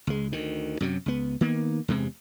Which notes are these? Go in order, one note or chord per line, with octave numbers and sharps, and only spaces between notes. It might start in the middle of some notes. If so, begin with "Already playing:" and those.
C#2 G#3
D2 D#3
F#2 C3 F#3
C#2 B3
D#3 A#3 B3
E2 G2 C3 G#3